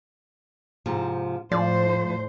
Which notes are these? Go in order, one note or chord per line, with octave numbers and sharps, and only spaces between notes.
G#2 C3 F3
A2 F3 C5 D5